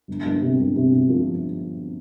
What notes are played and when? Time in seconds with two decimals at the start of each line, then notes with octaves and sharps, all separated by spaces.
0.08 G1
0.25 G1
0.42 C3
0.59 G1
0.76 C3
0.93 C3
1.09 F3